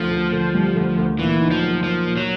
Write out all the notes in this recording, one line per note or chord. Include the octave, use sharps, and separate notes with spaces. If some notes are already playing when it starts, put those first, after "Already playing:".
Already playing: D2 F3
D2
D3
G3
D2
D2
A#2 E3
D#4
F3
F#3
F3 A#3
A#2
F#3